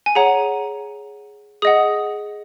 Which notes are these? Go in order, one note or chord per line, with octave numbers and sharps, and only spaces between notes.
G#5
G#4 C#5 F#5 A#5
G#4 D#5 F#5 D#6